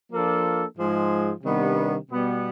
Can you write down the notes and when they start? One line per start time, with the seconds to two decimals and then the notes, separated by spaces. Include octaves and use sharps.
0.11 F3 A#3 D4 F4 A4
0.78 G#2 F3 G#3
1.44 C3 D#3 G3 B3 D4
2.11 B2 G3 B3